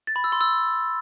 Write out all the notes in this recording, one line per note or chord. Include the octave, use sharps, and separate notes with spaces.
A6
B5
E6
C6
E6